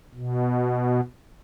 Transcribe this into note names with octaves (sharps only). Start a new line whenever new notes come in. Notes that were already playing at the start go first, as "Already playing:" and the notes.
B2